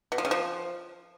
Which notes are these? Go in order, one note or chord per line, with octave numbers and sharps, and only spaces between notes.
B2
F3
C#3
F3